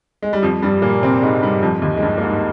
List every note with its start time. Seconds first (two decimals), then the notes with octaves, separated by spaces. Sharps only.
0.22 G#3
0.33 G3
0.42 F2 F3
0.62 G2 G3
0.82 A#2 A#3
1.02 C3 C4
1.22 G#2 G#3
1.42 G2 G3
1.62 F2 F3
1.82 D#2 D#3
1.97 G#3
2.02 G2 G3
2.18 A#3
2.22 G#2 G#3